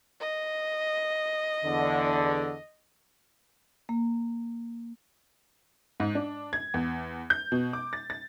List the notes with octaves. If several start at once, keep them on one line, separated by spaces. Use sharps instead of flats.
D#5
E2 D3
A#3
G#2
D4
G#6
E2
G6
B2
D6
A6
A6